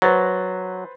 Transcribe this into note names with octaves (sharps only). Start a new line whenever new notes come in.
F#3 B4 C5 A6